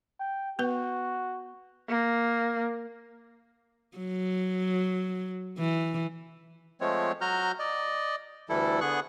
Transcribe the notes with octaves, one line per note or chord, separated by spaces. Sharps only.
G5
B3 F#4 B4
A#3
F#3
E3
F3 G#3 A3 C4 C#5
F#3 F#4 A#5 F6 G6
D5 D#5
D2 E3 G3 E4 A4
D3 B3 G#4 C#6 F#6